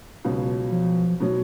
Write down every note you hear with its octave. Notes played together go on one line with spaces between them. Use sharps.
C#2 B2 F#3
F3
B2 F#3